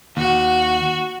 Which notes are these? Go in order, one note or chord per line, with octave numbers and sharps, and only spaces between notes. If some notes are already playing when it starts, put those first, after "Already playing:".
D#2 F#4